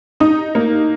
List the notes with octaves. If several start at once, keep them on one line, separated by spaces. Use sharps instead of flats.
D#4 D#6
A#3